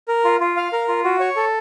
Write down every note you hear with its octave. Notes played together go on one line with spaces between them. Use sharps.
A#4
F4
F4
F5
A#4
F4
F#4
C#5
A4